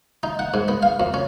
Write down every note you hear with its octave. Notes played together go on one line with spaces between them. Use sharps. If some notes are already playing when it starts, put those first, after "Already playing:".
D#4
F#5
G#2
B3
F5
F2
C#4